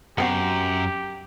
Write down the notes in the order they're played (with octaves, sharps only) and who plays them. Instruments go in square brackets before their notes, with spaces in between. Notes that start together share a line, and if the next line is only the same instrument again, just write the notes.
[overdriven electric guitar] F#2 [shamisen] B3 C4 F#4 [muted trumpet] G4